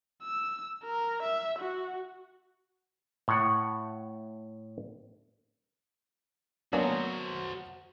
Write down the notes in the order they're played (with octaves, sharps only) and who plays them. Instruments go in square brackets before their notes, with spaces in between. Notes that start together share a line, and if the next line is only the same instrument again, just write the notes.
[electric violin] E6
A#4
E5
F#4
[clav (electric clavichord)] A2 F#5
[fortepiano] F#3 A#3 B3 [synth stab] C#4 D4 [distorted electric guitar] F#4 C5